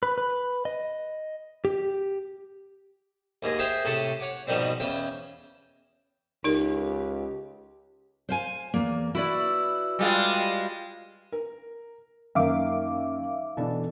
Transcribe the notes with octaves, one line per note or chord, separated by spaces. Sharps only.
B4
B4
D#5
G4
D#2 G#2 G#4 D#5 G#5
G#4 C5 E5 F5 G5
A2 C3 G4 A5 C#6 D#6
C#5 F#5 D6
G#2 B2 D#3 F3 G3 C4
E2 C#3 G5
C#2 D#4 G4 A#4
C5 F5 G#5
E2 A#3
E4 F#4 B4 D5
G3 G#3 F4
A#4
F#2 D#3 A#3 E5 F5 D6
B2 E3 D4 A4